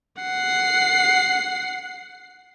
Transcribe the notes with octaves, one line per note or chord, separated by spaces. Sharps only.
F#5 C7